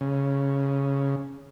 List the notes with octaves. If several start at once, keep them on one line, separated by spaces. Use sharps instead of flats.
C#3